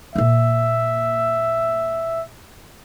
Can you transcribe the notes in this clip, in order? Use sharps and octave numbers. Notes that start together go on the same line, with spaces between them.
A#2 A#3 E5